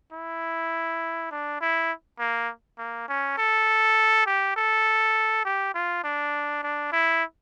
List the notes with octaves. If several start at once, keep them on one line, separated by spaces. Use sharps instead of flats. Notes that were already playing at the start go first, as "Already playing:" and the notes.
E4
D4
E4
A#3
A#3
C#4
A4
G4
A4
G4
F4
D4
D4
E4